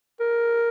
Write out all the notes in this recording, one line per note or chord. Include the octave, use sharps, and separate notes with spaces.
A#4